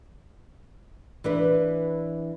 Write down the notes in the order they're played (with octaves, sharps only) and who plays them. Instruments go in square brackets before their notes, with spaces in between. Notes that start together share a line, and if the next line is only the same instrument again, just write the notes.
[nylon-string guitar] E3 D4 B4